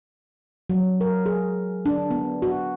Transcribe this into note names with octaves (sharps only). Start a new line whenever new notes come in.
F#3
A#4
G#4
D4
B3
F#4